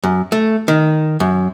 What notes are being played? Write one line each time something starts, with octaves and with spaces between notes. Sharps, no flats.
F#2
A3
D#3
F#2